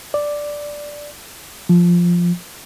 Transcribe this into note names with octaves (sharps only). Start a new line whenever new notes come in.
D5
F3